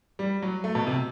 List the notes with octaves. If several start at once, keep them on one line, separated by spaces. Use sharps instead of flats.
G3
F#3
A3
B2
C3